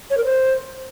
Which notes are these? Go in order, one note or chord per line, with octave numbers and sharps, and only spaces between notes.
C#5
A#4
C5